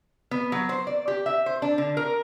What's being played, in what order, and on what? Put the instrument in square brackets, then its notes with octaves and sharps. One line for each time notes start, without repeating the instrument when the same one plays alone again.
[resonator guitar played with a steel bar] B3
F#3
C5
D5
G4
E5
C5
D4
D3
A#4